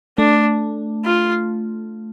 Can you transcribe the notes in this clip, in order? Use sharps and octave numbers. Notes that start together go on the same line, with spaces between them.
A3 D4
F4